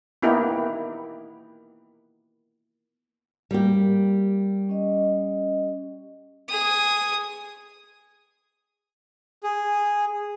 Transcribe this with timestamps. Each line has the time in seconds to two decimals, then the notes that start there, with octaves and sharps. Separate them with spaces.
0.22 A#3 B3 D#4 E4 G4
3.51 G3 A#3 G4
4.69 C#4 D#5
6.49 G#4 D#6
9.44 G#4